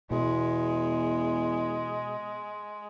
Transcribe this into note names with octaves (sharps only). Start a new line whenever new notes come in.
E2 B2 G#3